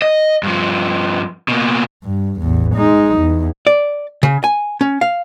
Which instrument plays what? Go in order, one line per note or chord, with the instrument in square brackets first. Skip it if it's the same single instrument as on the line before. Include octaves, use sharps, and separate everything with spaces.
[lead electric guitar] D#5
G2 F3
B2 A#3
[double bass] G2
A1 E2
G#3 D#4
E2
[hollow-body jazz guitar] D5
C#3
G#5
C#4
F5